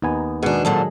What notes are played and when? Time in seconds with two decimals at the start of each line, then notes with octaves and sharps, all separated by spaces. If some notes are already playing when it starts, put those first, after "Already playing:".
0.02 D#2 B3 D#4 G#5
0.43 B2 D#3 G#3 D4 G#4
0.65 F2 A#2 D3 F#3 A4